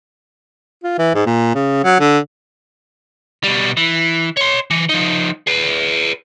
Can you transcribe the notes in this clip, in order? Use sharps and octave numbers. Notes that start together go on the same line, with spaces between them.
F4
E3
G#2
A#2
C#3
F#3
D3
B2 G3
E3
C#5 C6
E3
F3 D#4
G#4 B4